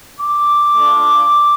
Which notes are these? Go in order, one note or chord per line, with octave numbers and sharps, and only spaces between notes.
D6
A3 D4 F4